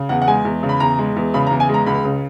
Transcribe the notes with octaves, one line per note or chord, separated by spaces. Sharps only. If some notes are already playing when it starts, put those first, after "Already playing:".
Already playing: C#3
E2 F#5
F#5
G#3 G#5
E2
C#3
B5
E2 A#5
G#3
E2
C#3 B5
A#5
E2
G#5
G#3
A#5
C#2 B5
C#3